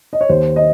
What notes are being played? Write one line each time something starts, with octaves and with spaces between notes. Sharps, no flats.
D#5
C#5
D#2 C5
D#5